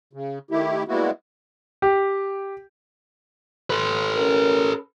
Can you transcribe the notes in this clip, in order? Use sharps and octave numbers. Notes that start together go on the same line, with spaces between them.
C#3
D#3 A3 E4 G4
G3 G#3 A#3 B3 E4 F#4
G4 G5
A4 B4
C#4 A#4